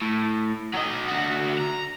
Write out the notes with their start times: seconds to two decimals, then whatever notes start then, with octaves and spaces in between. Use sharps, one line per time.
0.02 A2
0.74 F#3 D#5
1.08 D3 F#4
1.58 A#5